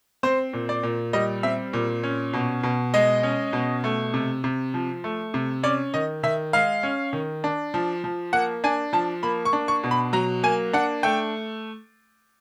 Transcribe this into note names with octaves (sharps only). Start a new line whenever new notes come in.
C4 C5
A#2
D5
A#2
G3 D#5
C4 E5
A#2
C#4
B2
B2
G#3 D#5
C#4
B2
A3
C3
C3
F3
A3
C3
C#4 D5
D#3 D#5
D#3 E5
G#3 F5
C#4
D#3
D4
F3
F3
A#3 F#5
D4 G#5
F3 A5
A#3 B5
C#6
D4
C#6
B2
B5
F#3 A#5
A#3 G#5
D4 F#5
A3 G5